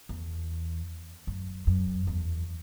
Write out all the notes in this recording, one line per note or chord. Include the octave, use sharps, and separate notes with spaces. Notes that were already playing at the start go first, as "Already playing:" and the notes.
E2
F#2
F#2
E2